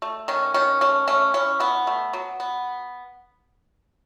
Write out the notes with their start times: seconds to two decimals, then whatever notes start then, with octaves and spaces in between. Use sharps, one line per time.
0.02 A3
0.28 D#3 C#4
0.54 D#3 C#4
0.81 A3 C#4
1.08 A3 C#4
1.34 E3 C#4
1.60 E3 B3
1.87 A3
2.13 F#3
2.40 B3